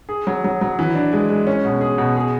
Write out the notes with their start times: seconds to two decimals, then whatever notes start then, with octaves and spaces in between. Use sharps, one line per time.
0.09 G#4
0.27 F#3
0.44 F#3
0.61 F#3
0.79 E3
0.95 D4
1.13 G#3
1.30 G#3
1.47 C#4
1.65 B2
1.81 G#4
1.98 B2
2.16 G#4